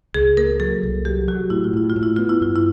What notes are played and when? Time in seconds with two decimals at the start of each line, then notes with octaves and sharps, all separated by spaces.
0.14 C#2 G#4
0.37 A#3 A#4
0.60 F#3 A4
0.83 C2
1.05 F#3 G4
1.28 F#3 F#4
1.50 A2 E4
1.64 F4
1.73 A2 E4
1.90 F4
1.96 A2
2.03 E4
2.16 B3 F4
2.29 E4
2.41 G2 F4
2.56 E4